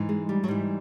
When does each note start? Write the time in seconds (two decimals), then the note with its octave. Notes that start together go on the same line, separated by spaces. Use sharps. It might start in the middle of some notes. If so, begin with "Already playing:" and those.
Already playing: G#2 E3
0.09 G#3
0.29 G3
0.44 F#3
0.48 G#2 E3 G3